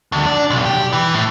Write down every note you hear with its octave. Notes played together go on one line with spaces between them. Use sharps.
D2
D4
B1
G4
E3
A2